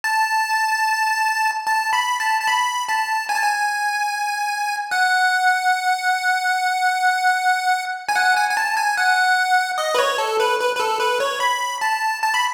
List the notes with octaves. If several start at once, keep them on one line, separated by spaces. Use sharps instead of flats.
A5
A5
B5
A5
A5
B5
A5
G#5
A5
G#5
F#5
G#5
F#5
G#5
G#5
A5
G#5
F#5
D#5
B4
C#5
A4
B4
B4
B4
A4
B4
C#5
B5
A5
A5
B5